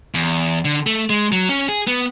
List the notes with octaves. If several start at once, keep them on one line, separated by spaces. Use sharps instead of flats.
E2
D3
A3
G#3
F#3
C#4
G#4
B3